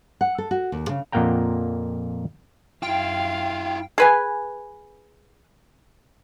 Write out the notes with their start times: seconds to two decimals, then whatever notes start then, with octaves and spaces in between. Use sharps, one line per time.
0.21 F#5
0.38 A4
0.51 F#4
0.72 D#2
0.89 C#3
1.12 F2 A#2 A#3 F#5 G5 A#5
2.83 F#2 E4 F4 F5 G5
3.98 G#4 B4 G#5